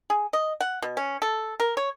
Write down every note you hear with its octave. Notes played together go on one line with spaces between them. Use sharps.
G#4
D#5
F#5
B2
C#4
A4
A#4
C#5